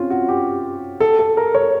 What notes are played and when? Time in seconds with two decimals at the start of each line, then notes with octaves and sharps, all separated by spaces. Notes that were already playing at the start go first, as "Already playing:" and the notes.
Already playing: C4 C#4 F4
0.10 F#4
0.28 G4
1.00 A4
1.19 A4
1.37 A#4
1.55 C#5